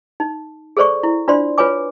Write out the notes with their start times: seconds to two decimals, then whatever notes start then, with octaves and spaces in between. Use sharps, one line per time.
0.20 D#4
0.77 G#4 A4 C5 D5 C#6
1.03 E4
1.28 D4 F4 C5 D5 C6
1.58 F4 B4 C#5 G#5 D6